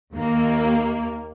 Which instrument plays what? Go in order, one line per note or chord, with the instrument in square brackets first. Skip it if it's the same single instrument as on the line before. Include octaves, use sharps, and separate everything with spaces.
[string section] D#2 A#3